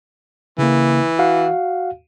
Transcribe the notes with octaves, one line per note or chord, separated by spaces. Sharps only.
C#3 E3 A#3
F#4 F5 F#5